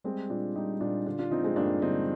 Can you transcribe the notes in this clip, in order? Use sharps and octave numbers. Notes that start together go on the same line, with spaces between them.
G3 G#3 C4
A#2 D4 F4
A#2 D#4 G4
A#2 D4 F4
D3 D4 F4
D4 F4
F3 C4 D#4
G#3 C4
G2 A#3 D4
D3 C4 D#4